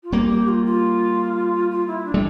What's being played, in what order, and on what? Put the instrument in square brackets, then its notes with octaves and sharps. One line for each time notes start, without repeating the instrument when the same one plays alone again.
[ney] F4
[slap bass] G3 A#3 [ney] G4
[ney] G4
F4
F4
F4
E4
D4
[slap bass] G3